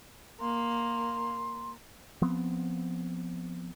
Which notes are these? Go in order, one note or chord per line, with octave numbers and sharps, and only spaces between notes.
A#3 C6
F3 B3 C4